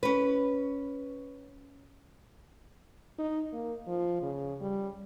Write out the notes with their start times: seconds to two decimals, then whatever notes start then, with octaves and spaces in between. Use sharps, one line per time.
0.03 C#4 B4
3.19 D#4
3.52 A#3
3.87 F3
4.22 C#3
4.60 G3